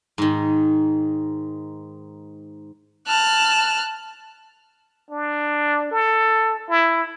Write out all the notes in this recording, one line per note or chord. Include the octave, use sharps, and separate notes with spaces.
G#2 D#3
A5 F6 F#6
D4
A4
E4